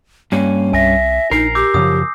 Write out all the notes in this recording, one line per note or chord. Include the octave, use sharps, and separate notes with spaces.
G2 A#3 C#4
C2 E5 G#5 A#6
A#1 D#4 A#4 C7
G4 D6 E6 G6
F#2 C#3 F3 D#6